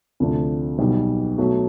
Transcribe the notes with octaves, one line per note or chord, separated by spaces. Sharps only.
D2 C3 F3 A3 D4
B1 B2 G3
B2 F#3 A3